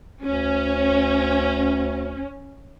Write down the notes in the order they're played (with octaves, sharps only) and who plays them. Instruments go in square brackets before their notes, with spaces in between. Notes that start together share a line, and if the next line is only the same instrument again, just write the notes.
[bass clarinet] D2 [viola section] C#4